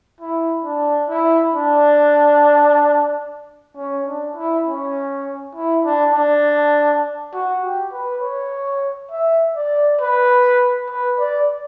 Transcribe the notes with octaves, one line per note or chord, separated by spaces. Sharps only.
E4
D4
E4
D4
C#4
D4
E4
C#4
E4
D4
D4
F#4
G4
B4
C#5
E5
D5
B4
B4
D5